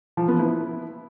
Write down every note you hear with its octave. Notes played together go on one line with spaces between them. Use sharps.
F3
B3
E4